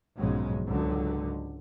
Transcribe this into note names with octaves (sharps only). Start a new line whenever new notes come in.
B1 F2 G#2 C#3 G#3
C#2 G#2 D3 F#3